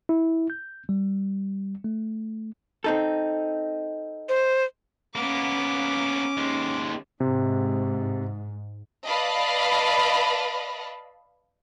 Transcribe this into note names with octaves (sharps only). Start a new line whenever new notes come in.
E4
G6
G3
A3
C4 D#4 A4
C5
A#3 B3 C#4 D6
D#2 G#3
G#2 C3
B4 D5 D#5 F5 A5 B5